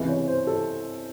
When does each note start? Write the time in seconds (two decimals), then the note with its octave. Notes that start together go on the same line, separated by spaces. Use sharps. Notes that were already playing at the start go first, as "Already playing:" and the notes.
Already playing: C#2 C3 E3 G#3
0.08 C#5
0.28 C5
0.47 A4